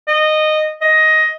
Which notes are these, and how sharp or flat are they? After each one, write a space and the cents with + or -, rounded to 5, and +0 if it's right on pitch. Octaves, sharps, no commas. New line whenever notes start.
D#5 -15
D#5 +10